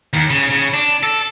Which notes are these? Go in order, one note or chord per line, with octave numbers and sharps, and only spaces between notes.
D#2
C#3
C#3
D4
A4